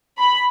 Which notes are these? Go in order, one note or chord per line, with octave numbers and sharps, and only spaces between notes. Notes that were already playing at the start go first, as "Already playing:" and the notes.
B5